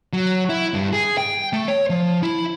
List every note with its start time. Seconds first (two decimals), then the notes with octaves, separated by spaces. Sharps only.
0.13 F#3
0.49 E4
0.74 G2
0.93 G#4
1.18 G5
1.53 A3
1.68 C#5
1.90 F3
2.23 E4